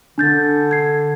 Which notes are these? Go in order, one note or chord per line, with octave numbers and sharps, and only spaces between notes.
D3 D4 G6 A6
G#6 C7